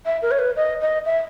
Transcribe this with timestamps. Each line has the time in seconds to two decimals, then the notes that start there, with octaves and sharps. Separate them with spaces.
0.06 E5
0.22 A#4
0.31 C#5
0.39 B4
0.56 D#5
0.81 D#5
1.06 E5